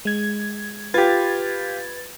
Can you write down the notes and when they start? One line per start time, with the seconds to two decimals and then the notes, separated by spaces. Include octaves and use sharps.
0.05 G#3 G#6
0.94 F4 G4 B4 G#6 A6